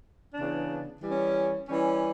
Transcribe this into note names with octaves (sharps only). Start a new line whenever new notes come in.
C#3 E3 B3 D4
E3 G3 C#4
E3 G3 C#4